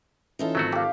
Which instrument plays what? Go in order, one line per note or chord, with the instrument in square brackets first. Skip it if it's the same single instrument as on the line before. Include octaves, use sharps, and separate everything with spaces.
[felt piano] E3 C#4 [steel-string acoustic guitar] D#4 F4 A4
[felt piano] G#1 [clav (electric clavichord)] F#3 A3 F#4
[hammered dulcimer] G4 F5